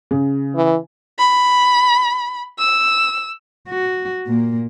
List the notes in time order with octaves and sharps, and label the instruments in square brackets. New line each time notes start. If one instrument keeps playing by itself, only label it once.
[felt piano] C#3
[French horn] E3
[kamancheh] B5
E6
[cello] F#4
A#2 A#3